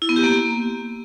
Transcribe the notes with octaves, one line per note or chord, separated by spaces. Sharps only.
E4
B3
G4
A#3